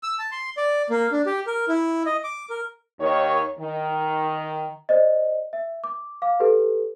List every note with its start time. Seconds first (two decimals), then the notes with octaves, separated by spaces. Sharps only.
0.03 E6
0.19 A5
0.32 C6
0.57 D5
0.90 A#3
1.12 D4
1.26 G4
1.47 A#4
1.68 E4
2.06 D#5
2.24 D6
2.50 A#4
3.01 D#2 D#3 C#5
3.60 D#3
4.89 C5 D5 D#5
5.53 E5
5.84 D6
6.22 F5 D6
6.40 G4 A4 B4